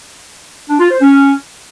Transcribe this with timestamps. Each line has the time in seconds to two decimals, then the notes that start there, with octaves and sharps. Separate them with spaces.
0.69 D4
0.80 F4
0.90 C5
1.01 C#4